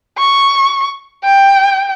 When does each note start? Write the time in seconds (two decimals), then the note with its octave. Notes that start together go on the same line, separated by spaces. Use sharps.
0.18 C#6
1.25 G5